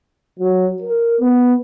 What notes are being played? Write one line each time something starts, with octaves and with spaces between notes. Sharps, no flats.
F#3
A#4
B3